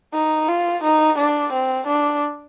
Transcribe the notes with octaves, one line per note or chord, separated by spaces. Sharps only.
D#4
F4
D#4
D4
C4
D4